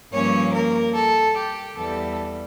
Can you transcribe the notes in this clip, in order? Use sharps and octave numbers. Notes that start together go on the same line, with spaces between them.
G2 F3 A#3 C#4 C#5
A#3 A#4
A4
G4
E2 E3 G3 A4